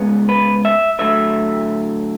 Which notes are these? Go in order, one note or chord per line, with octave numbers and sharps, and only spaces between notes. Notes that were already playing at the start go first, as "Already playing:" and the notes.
Already playing: C#3 G#3 B3
B4
E5
D3 F#3 A3 E5